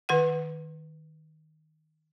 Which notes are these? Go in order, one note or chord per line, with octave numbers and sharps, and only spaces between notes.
D#3 B4 F#5